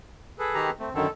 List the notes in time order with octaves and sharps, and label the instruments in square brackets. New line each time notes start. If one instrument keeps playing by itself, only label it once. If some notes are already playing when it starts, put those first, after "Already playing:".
[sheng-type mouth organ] G#4 A4 B4
[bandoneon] D#3 G4 A#5
[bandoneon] A3 [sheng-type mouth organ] C4
[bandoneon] F#2 D3 D#3 [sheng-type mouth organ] A4